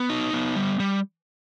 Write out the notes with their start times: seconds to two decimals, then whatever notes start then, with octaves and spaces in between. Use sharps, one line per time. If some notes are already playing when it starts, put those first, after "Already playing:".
Already playing: B3
0.10 D#4
0.33 B3
0.56 G3
0.80 G3